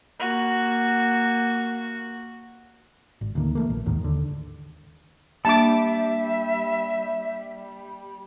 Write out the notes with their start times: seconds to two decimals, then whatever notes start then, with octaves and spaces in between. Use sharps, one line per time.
0.20 A#3 F#4
3.21 G#1
3.35 D2 D#3 A#3
3.55 E3 A3 A#3
3.70 A#1
3.86 A1 D#2 G#2 D#3
4.01 D#2 D3
5.45 G3 A#3 D4 E5 A5 D6